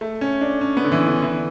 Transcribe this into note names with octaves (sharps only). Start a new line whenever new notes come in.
A3
C#4
D4
C#4
B3
D3
E3
D3
E3